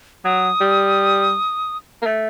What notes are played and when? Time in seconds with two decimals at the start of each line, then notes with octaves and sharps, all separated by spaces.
0.25 F#3 D#6
0.60 G3
2.02 A#3
2.06 A3